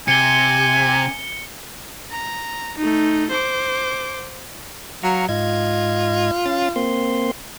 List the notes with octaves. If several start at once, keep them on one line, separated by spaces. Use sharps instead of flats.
C3 G#5 C#7 G7
A#5
A3 D#4
C5 D6
F#3 F5 A#5 C#6
G#2 F4 D#5 G#6
C#4 F5 A6
A#3 C4 C6